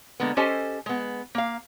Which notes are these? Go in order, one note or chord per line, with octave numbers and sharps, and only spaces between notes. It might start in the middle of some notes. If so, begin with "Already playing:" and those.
D3 G#3 A#3 B3
C#4 G4 A4 C5 D#5 G#5
G#3 B3
A#3 F5